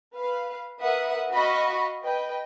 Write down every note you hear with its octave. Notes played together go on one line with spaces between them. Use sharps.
B4 F5
A#4 B4 E5 F#5 D#6
F#4 D#5 F5 B5 C#6
B4 D#5 G5